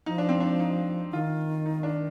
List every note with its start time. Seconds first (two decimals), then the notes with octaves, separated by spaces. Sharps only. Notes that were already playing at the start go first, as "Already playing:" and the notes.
0.06 F3 D#4
0.18 D4
0.29 C4
0.40 D4
0.60 D#4
1.13 D#3 F4
1.66 D#4
1.83 D4